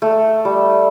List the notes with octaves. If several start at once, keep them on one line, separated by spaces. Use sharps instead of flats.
A3
G3